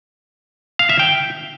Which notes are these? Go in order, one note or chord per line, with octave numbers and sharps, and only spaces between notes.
F5
E5
G5